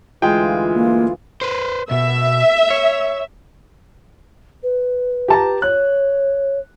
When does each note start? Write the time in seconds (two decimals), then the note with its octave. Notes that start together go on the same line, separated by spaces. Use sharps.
0.22 D2 E3 G#3 F4 G5
0.75 A#3
1.41 B4 C5
1.91 B2 E5
2.70 C#5
4.63 B4
5.28 G4 A5 A#5
5.62 C#5 F#6